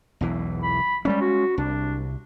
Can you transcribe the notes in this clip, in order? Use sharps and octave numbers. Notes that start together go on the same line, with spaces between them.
B1 E2 E3
B5
G3 G#3 A#3 C#4
F#4
C2 D4